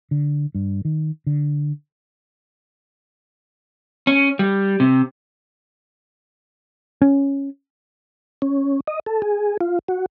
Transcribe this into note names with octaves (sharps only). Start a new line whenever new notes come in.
D3
G2
D#3
D3
C#4
G3
C3
C#4
C#4
D#5
A4
G#4
F4
F#4